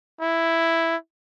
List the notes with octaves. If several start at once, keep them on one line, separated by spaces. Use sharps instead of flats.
E4